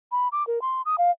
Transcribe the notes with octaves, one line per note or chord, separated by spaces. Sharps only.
B5
D6
A#4
C6
D#6
F5